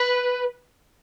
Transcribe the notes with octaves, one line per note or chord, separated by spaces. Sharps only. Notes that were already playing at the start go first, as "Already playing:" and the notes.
Already playing: B4